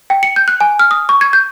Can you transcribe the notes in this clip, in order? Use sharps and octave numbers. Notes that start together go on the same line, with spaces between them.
G5
C#7
G6
F#6
G#5
F6
D#6
C#6
G#6
G6